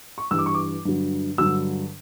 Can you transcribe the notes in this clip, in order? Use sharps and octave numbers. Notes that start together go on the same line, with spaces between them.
C#6
G2 E3 G3 E6
D6
C#6
D6
G2 D3 F#3
G2 D3 F#3 E6